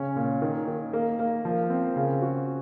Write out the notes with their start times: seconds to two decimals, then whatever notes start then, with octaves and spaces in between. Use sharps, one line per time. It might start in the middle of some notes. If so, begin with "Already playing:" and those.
Already playing: C#3 C#4
0.16 A#2
0.42 D#3
0.68 D#3
0.93 A#3
1.19 A#3
1.45 F3
1.70 C4
1.96 C#3
2.22 F#4